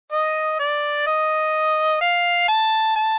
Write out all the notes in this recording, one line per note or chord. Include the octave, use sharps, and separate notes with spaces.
D#5
D5
D#5
F5
A5
A5